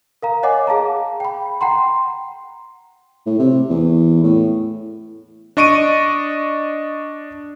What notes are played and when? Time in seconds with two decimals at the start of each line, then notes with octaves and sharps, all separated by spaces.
0.23 A#4 F5 A#5
0.43 C#5 D#5 F#5 G#5 D6
0.67 G#4 F5 A5 A#5
1.20 G5 B5
1.61 F#5 G5 A#5 C6
3.26 A2
3.39 C3
3.70 E2
4.23 A2
5.57 D4 D#5 C#6 D7 D#7